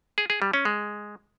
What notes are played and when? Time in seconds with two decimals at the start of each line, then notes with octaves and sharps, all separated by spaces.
0.18 G#4
0.30 G#4
0.42 G3
0.53 C#4
0.65 G#3